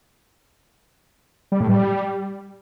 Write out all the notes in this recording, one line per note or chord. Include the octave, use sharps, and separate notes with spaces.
G3
A2
G3